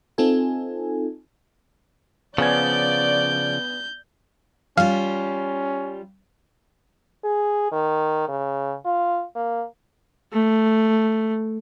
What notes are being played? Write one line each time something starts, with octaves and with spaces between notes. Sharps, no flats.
C4 D#4 F4 A4 G#5
C#3 F3 B3 D5 G#5 G6 G#6
G3 C#4 F4 F5
G#4
D#3
C#3
F4
A#3
A3